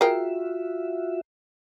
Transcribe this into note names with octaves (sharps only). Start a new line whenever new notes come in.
F4 F#4 G#4 A#4 E5 G5